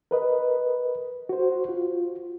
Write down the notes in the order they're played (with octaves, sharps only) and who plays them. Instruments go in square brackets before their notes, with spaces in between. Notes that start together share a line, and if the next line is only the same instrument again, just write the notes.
[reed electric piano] A#4 B4 D#5
F#4 C5
F4